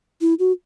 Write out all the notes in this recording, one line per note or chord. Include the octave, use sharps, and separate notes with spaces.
E4
F#4